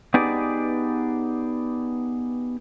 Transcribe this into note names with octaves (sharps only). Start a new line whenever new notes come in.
B3 D#4 G4 G#4 B4 D5